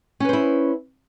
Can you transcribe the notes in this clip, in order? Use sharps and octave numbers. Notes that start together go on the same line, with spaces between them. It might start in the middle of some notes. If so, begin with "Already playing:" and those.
C#4 E4 B4 C5